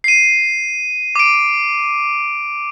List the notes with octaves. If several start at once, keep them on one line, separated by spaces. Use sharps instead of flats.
C7 D#7
D6 D7